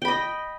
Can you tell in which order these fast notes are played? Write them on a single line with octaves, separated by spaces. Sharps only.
G5 B5 D#5